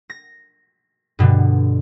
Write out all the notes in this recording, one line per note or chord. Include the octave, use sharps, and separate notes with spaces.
A#6
G2 B2 D3